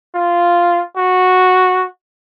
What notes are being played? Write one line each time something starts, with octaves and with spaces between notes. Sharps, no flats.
F4
F#4